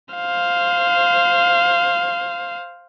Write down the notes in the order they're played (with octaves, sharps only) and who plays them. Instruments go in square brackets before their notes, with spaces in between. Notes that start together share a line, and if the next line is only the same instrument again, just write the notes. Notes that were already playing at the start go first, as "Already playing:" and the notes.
[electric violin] C5 F5